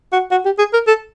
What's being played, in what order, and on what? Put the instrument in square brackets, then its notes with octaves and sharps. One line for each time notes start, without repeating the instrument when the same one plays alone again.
[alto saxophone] F#4
F#4
G4
G#4
A#4
A4